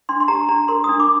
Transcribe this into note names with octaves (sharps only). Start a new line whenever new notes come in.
D4 C6
C6
G4 A#5
D4 A#5
A#4 C6
D#6
D4
D6